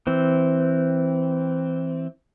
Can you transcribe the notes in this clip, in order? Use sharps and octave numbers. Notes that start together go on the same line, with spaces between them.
E3 C4